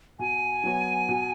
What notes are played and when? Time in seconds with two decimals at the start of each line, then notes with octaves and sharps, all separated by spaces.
0.19 B2 G#5
0.63 F#3 B3 F#4 C#5
1.09 B2